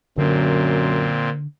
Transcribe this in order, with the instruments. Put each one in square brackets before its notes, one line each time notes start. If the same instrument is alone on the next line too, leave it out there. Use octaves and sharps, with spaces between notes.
[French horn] F#2 [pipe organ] A#2 C4 [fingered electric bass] D3